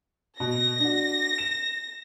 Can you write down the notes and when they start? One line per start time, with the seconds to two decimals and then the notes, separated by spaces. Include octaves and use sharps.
0.40 B2 A#6
0.80 D4 F#4
1.38 E7